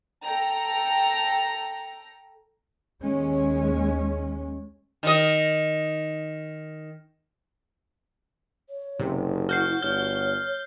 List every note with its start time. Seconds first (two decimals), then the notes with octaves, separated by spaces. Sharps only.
0.24 A4 G5 A#5
3.04 D#2 G#3 C#4
5.03 D#3 D#5
8.70 C#5
8.99 F#1 C3
9.49 E4 F#4 F6 G6 C7
9.82 G1 C#5 F6 G6 G7